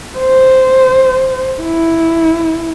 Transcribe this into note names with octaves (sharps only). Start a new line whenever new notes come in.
C5
E4